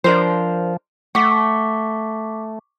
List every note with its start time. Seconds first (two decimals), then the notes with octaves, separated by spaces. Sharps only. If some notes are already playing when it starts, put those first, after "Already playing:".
0.04 F3 D4 A#4 C5
1.15 A3 F#5 C#6 D6 B6